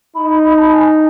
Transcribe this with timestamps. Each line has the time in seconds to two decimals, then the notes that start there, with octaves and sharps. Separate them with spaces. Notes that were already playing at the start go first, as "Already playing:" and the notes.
0.15 D#4 B5
0.30 B5
0.43 B5
0.58 A5
0.73 G#5